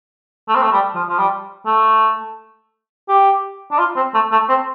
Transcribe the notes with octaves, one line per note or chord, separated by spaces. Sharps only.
A3
C4
A3
G3
F3
F3
G3
A3
G4
D4
F4
C4
A3
A3
C4